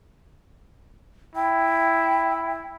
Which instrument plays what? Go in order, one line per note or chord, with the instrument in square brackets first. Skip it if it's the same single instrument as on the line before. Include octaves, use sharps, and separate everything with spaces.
[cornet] E4 [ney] G5